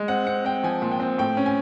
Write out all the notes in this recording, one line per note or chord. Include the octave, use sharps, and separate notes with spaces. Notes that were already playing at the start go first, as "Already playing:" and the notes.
Already playing: G#3
C4 F#5
C4 F#5
C4 G5
F3 G#5
A#2
G5
C4
A2 G5
C#4
G#5